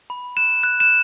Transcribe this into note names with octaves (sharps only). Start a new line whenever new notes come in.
B5
F#6 E7
F#6
E7